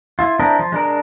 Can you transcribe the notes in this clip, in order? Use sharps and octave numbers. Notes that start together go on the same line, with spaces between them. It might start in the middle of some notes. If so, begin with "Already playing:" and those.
E4 F4
C4 D4 E4 A#4 D#5
F3
G#3 D4 A#4